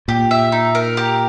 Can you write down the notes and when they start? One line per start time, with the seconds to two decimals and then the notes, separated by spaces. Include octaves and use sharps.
0.08 A#2 G4
0.31 E5
0.52 D#4
0.75 A#4
0.97 G4